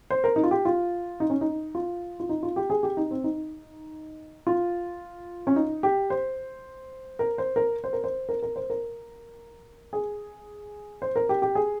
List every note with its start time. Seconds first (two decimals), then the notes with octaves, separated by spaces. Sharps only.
0.10 C5
0.24 A#4
0.36 D#4
0.43 F4
0.51 G4
0.65 F4
1.20 D#4
1.30 C#4
1.41 D#4
1.75 F4
2.20 F4
2.29 D#4
2.43 F4
2.56 G4
2.70 G#4
2.83 G4
2.97 D#4
3.11 C4
3.24 D#4
4.47 F4
5.47 C#4
5.56 D#4
5.83 G4
6.10 C5
7.19 A#4
7.38 C5
7.56 A#4
7.84 C5
7.93 A#4
8.04 C5
8.29 A#4
8.43 A#4
8.56 C5
8.70 A#4
9.93 G#4
11.02 C5
11.16 A#4
11.29 G4
11.42 G4
11.55 G#4